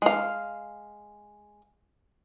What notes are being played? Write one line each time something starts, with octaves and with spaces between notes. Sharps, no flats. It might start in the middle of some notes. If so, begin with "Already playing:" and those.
G#3 F5